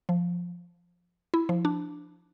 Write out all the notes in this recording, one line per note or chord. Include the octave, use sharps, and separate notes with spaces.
F3
E4
F3
D4